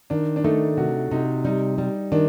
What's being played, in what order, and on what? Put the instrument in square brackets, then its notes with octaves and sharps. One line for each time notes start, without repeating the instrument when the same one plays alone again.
[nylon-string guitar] D#3 [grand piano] D4
[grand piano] D4
[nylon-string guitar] A3 [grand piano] D#4
[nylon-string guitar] C3 [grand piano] F#4
[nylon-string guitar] C3 [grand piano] D#4
[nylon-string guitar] G3 [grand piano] D#4
[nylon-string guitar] G3
[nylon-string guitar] D#3 [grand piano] D4